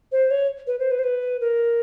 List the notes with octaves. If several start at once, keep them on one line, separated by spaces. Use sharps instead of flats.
C5
C#5
B4
C5
B4
C5
B4
A#4